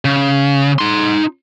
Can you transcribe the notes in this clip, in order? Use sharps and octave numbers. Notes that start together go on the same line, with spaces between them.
C#3
D#4 C6